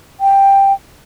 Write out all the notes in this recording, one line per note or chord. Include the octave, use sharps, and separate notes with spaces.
G5